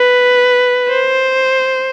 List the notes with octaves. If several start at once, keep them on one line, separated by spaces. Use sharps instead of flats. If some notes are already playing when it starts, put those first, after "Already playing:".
Already playing: B4
C5